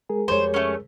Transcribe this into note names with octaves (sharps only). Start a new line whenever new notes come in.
G#3 G#4 A#4
F2 G3 C5 C#5
A3 C#4